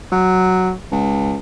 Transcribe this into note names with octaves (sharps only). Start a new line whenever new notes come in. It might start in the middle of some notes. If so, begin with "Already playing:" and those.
F#3
C#2